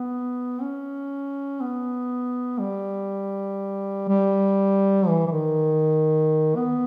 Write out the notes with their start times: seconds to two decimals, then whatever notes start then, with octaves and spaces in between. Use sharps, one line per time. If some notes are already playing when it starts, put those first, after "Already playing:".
Already playing: B3
0.61 C#4
1.61 B3
2.59 G3
4.08 G3
5.07 E3
5.27 E3
5.31 D#3
6.56 B3